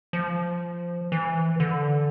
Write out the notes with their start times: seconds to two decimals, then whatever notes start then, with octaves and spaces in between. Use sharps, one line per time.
0.13 F3
1.12 E3
1.60 D3